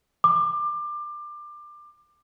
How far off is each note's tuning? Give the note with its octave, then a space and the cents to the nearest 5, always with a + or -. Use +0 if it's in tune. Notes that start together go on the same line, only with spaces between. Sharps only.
D6 +25